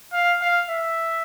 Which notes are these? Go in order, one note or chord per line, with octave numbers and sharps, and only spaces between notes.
F5
F5
E5